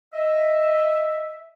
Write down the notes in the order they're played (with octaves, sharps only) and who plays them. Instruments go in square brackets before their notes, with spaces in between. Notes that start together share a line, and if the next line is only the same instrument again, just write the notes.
[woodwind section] D#5 E5